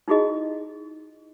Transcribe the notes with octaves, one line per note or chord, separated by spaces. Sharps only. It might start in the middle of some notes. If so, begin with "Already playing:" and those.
D#4 E4 F#4 G#4 D#5